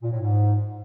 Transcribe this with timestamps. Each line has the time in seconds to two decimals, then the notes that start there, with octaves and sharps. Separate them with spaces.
0.02 A#2
0.11 A2
0.20 G#2